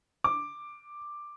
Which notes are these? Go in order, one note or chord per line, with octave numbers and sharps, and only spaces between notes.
D6